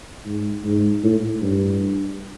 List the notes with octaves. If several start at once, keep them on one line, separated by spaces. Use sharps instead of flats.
G#2
G#2
A2
G2